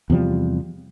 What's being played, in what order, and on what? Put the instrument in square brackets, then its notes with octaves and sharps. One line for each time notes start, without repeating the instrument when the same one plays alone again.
[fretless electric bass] E2 C3 F3 G3